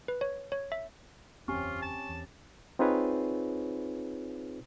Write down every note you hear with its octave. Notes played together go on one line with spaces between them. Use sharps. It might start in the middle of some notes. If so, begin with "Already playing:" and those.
B4
C#5
C#5
E5
F#1 E2 C4 C#4 F4 G4 G#5 C#6
A5
E2
C4 D#4 F4 G#4 B4 C#5